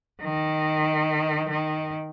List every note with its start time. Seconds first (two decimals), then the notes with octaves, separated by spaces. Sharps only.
0.22 D#3
1.49 D#3